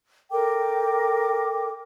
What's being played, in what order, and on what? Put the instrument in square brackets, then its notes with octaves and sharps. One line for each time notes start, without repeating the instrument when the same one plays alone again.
[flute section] A4 A#4 G5 D6